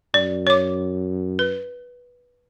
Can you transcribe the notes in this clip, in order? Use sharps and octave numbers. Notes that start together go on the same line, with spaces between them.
F#2 D5
C#5 D6
B4